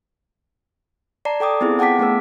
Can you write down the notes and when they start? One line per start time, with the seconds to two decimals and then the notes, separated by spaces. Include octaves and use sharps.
1.25 D5 A5 A#5 C7
1.40 A4 G5 D6 D#6
1.61 B3 C4 E4 F4 G#4
1.79 F#5 G5 A5 D6 B6
1.99 A3 B3 C#4 G#4 A#4 E6